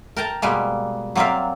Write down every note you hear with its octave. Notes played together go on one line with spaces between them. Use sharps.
A#4 G5 A5 A#5
B2 G3 G#3 A#3
F#3 A#3 C4 D5 E5 F5